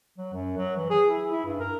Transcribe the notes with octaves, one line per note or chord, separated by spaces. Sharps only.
F#3
F#2
F#3
E3
G#4
E4
E4
G2
A#4